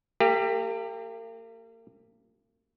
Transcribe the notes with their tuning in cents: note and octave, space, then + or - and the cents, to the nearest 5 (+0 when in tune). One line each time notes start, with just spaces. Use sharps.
A#3 -40 G4 +15 F5 -45